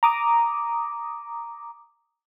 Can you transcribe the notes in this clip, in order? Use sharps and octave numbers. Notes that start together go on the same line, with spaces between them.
A#5 D6 D#6